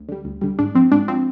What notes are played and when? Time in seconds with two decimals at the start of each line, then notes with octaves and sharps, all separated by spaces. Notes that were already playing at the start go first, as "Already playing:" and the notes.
Already playing: D2
0.08 D3 G3
0.25 D2
0.41 D3 G3
0.59 G#2 D4
0.75 F3 C4
0.92 G#2 D4
1.08 F3 C4